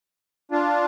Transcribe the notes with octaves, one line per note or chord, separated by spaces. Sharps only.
D4 F4